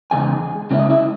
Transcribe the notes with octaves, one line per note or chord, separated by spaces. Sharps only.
E2 C#3 G#3 D#4 G#4 G#5
C#3 G#3 C#4 E4
D#5
E4 E5